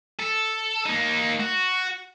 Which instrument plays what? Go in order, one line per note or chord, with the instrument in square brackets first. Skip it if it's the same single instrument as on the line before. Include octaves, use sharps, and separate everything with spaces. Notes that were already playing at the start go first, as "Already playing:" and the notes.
[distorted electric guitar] A4
A#3 D#4
F#4